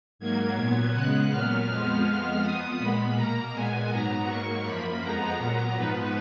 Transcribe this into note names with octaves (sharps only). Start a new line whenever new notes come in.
G#2 F#3 A#3 G#6
A#2 F#3 B3 G#6
C#3 G#3 B3 F#6
A#2 F#3 B3 F6
F2 F3 G#3 B3
F2 F3 G#3 B3 F6
F2 F3 B3 D#6
A#2 G#3 B3 B5
B2 A#3 A#5
A#2 G#3 B3 G#5
G#2 F#3 B3 A#5
G#2 F#3 A#3 C#6
F#2 F3 A#3 B5
F2 F3 G#3 B3 A#5
A#2 F#3 B3 A#5
G#2 F3 B3 B4